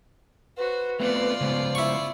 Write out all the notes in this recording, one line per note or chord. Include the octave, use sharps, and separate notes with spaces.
F#4 B4 C5
A3 B3 C4 F4 D5
C#3 G#3 B3 C5
E4 C#6